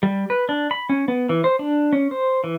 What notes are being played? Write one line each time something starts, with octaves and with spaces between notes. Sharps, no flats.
G3
B4
D4
B5
C#4
B3
E3
C5
D4
C#4
C5
E3